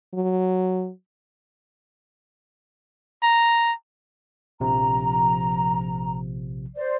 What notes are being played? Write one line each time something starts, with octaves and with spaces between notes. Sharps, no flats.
F#3
A#5
A#1 C3 F3 A#5
C5 D5